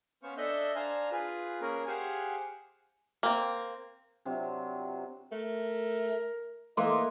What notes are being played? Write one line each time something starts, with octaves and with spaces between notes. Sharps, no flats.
B3 C#4 C5 F5 C#6
D4 A4 D#5 E5 F#6 G6
D4 C5 F5 G#5 A#5
F4 G#4 B4
A#3 C#4 G#4 A#4
G4 G#4 C5 F5 F#5 G#5
A#3 C4
C3 F#3 D4 F4
A3 A#4
E3 A#3 D#5 C6 D6